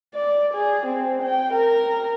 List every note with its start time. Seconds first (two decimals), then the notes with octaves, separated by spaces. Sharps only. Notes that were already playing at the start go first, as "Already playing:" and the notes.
0.14 D5
0.54 G#4
0.86 C4
1.22 G5
1.53 A#4